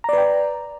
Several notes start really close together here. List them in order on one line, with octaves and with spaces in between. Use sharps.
A#5 D5 B4 G5